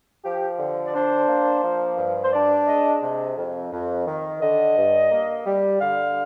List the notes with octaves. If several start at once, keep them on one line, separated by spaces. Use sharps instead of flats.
F3 G4
D3
D5
D4 C5
A#3
F3
G2
C5
D4 D5
G#3 D#5
C3
F2
F2
D#3
D3 D#5
G2
A#3
G3
D3 F5